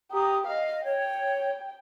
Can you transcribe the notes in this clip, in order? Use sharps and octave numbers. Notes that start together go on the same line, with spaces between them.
G4 A#5 D#6
D#5 F5
C#5 G5